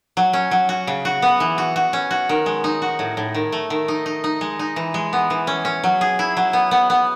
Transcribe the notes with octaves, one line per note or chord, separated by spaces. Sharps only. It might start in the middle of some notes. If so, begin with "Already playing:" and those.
F#3
C#4
F#3
F#4
C#3
F#4
B3
E3
F#4
F#4
C#4
F#4
D#3
G#3
D#4
F#4
A2
A2
D#3
A3
D#3
D#4
D#4
D#4
G#3
D#4
E3
G#3
B3
E3
C#4
C#4
F#3
G#4
E4
F#3
B3
B3
B3